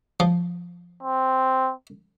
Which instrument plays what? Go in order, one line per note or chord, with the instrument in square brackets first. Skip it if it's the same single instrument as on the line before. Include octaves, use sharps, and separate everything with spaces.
[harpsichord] F3
[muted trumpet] C4